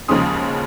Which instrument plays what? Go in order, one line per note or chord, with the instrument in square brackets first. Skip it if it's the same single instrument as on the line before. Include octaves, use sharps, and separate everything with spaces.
[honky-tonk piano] D#2 C#3 F3 G#3 C#4 C6 D#6